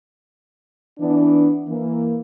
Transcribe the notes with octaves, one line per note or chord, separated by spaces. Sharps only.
E3 B3 D4
E3 A#3